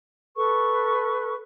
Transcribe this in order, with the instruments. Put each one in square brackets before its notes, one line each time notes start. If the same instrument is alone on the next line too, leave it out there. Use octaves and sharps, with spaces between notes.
[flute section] A4 B4 C#6